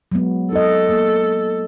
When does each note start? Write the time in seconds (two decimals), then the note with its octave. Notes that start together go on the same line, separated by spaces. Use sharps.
0.12 F#3 G#3 B3
0.52 D#4 A4 D#5
0.89 A#3